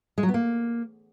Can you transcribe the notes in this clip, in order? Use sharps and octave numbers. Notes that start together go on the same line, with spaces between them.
G#3
F#3
B3
A#3